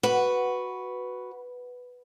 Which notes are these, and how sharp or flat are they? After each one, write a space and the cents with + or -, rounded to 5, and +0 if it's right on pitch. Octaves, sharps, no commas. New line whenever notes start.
F#4 +0 B4 +0